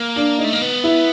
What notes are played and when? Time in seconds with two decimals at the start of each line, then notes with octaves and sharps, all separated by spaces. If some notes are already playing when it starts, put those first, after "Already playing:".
Already playing: A#3
0.16 D4
0.38 D#4
0.44 A3
0.53 A#3
0.62 B3
0.84 E4